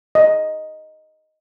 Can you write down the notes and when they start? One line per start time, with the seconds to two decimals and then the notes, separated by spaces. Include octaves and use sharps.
0.15 D#5